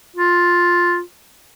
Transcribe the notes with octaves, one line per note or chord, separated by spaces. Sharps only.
F4